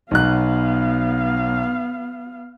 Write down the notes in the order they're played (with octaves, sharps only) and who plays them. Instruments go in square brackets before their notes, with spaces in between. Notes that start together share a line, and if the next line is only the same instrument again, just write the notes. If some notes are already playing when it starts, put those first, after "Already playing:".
[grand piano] B1 F#3 F#6 [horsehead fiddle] B3 F5